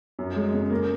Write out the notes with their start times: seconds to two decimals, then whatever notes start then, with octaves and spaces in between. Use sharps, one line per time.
0.19 F#2
0.36 G#3
0.54 C#3
0.70 A#3